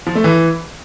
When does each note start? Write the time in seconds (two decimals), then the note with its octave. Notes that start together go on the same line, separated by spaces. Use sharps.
0.07 F3
0.15 A3
0.24 E3